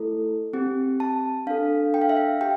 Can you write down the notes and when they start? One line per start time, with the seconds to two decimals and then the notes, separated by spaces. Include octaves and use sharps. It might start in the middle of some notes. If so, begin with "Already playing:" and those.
Already playing: A3 E4 A4
0.53 C4 G4
1.00 A5
1.47 D4 A4 F5
1.94 G5
2.01 F5
2.09 E5
2.17 F5
2.41 G4 G5